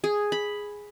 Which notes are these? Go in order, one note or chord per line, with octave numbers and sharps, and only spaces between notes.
G#4
B5